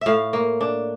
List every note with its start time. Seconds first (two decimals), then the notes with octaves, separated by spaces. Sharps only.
0.01 A2 E5 F5
0.33 A#3
0.61 D4